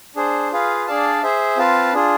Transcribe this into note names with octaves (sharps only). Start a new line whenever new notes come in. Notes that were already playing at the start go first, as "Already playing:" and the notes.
D4 G#4 C5
F4 G#4 B4 F5
D4 G#4 D5 F5 A5
G#4 C5 E5
C4 F4 B4 F5 A5
D4 F4 G#4